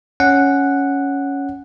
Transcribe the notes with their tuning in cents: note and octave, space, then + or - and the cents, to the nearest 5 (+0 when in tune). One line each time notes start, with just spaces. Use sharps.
C#4 +5 F#5 +0